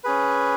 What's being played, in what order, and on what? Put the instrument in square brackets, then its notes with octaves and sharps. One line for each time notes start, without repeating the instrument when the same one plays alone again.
[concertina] C#4 G#4 B4